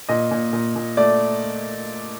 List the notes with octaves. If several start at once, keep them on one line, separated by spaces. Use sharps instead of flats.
A#2 D#5
A#2
A#2
A#2
A3 D5